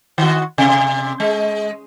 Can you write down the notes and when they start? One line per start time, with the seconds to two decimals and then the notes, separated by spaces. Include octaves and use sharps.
0.18 D#3 F#4
0.58 C3
1.20 G#3